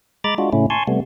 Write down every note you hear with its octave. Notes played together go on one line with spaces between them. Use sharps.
G#3 A#5 B5 D6 A6
G#3 D4 F4 F#4
A2 C#3 A3 C#4 E4
G#5 A5 C6 C#6
C3 G3 A3 B3